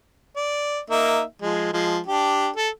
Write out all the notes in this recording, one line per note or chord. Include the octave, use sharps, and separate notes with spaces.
D5
A#3 D#4 E5
F3 G#3
F3 G#3
D4 G4
A4